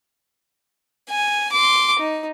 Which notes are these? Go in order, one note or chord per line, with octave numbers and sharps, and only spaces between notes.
G#5
C6 D6
D#4